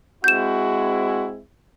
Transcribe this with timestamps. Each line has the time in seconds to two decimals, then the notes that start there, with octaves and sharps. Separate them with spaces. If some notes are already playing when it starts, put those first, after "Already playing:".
0.24 G#3 C4 E4 F#4 G6 E7